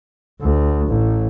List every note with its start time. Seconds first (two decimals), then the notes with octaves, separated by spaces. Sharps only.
0.41 D2
0.87 A1